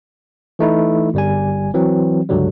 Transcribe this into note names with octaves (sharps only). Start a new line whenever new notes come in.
E3 A3 D#4 E4
G1 G3 G#5
E3 F#3 C4
C#2 G2 D3 F#3 G3